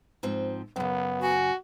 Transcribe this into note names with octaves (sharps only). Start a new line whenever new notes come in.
G#2 F3 C4
F#2 C#3 B3
F#4 G#5